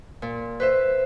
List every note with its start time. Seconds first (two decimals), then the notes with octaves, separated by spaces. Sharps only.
0.22 A#2
0.60 B4 C5 E5